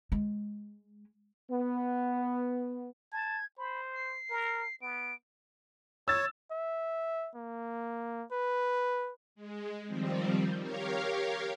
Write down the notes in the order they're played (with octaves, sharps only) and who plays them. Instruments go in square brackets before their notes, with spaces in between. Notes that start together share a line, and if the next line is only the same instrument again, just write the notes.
[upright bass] G#3
[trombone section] B3
[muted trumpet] A5 [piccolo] G#6
[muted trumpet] C5 [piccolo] B5
[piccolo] C7
[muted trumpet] A#4
[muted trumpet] B3 [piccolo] D7
[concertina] C#5 [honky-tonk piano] E6 A6
[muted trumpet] E5
A#3
B4
[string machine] G#3
D#3 F3 G3 C4
G4 A#4 C#5 F5